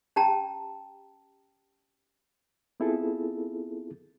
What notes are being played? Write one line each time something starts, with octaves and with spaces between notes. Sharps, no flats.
C#4 G4 G5 A5 A#5
B3 C4 E4 F4 G#4 A4